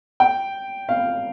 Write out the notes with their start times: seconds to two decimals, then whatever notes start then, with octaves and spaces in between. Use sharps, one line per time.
0.20 G5
0.89 F5